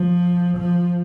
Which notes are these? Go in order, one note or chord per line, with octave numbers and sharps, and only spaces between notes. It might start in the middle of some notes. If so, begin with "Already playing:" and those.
Already playing: F3
F3